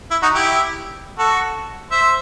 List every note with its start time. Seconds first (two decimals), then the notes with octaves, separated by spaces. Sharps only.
0.11 E4
0.22 D#4 F#4
0.34 E4 G4
1.19 F#4 A4
1.90 C5 E5